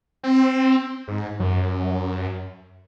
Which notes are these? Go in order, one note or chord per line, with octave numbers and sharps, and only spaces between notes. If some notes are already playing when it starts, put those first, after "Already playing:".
C4
G#2
F#2